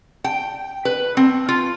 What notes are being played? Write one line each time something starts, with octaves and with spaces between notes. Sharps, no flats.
G5
B4
C4
F4